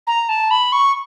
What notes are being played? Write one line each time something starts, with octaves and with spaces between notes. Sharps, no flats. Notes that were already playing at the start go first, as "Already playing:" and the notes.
A#5
A5
B5
C#6